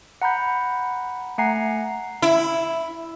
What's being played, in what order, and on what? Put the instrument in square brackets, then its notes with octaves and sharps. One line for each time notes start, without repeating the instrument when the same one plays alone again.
[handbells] F#5 A#5 B5 G6
A3 F#5 G#5 A#5 C7
[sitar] E4